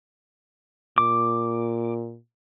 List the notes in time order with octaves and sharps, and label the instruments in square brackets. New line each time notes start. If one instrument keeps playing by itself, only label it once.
[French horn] A#2 [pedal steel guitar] D6